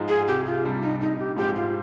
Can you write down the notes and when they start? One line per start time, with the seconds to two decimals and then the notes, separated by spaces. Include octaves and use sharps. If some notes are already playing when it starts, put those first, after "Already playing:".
Already playing: G#2 F3 G#3 D#4
0.08 G#4
0.27 C2 G4
0.46 F4
0.63 C3 G3 D4
0.82 D#4
1.00 A#1 D#4
1.18 G4
1.36 G#2 F3 G#3 C4 G4
1.56 F4